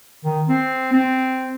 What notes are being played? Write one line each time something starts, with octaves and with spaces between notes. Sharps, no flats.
D#3
C4
C4